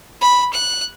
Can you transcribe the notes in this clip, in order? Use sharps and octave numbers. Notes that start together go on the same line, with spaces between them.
B5
F#6